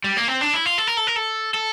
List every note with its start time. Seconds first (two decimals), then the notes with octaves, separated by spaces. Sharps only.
0.04 G3
0.17 A#3
0.28 C4
0.41 D4
0.54 E4
0.66 F4
0.78 A4
0.87 A#4
0.97 A4
1.07 A#4
1.16 A4
1.54 A4